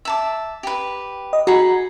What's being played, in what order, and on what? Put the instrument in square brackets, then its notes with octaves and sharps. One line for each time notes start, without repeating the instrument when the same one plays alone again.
[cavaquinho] E5 A5 D6
G4 B4
[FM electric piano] D#5
[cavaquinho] D#4 G#4 B5 [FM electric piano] F#4